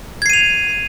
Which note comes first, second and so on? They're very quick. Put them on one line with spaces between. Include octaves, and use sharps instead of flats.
G#6 C7 D#7 F7